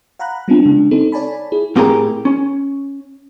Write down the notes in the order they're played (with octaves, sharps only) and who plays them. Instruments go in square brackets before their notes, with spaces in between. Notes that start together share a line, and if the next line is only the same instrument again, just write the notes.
[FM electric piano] F5 F#5 A#5 B5 F#6
G3 B3 C4 D4 E4 F4
C#3 G#3 D4
C4 D#4 A4
C#5 D5 G#5 A5 B5
E4 G#4
[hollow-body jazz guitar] A2 C4 G4 G#4 A#4 A#5
C#4